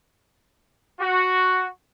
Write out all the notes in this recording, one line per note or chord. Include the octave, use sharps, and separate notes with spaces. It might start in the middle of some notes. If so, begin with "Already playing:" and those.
F#4